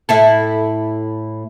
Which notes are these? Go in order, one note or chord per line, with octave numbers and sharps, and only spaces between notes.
A2 E4 A4